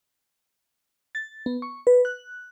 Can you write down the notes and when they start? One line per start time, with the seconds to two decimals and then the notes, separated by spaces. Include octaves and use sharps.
1.15 A6
1.46 B3
1.62 C#6
1.87 B4
2.05 F#6